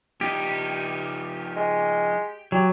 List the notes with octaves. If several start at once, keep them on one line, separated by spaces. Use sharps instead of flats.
F3 D#4 G4
G#3
F#3 G4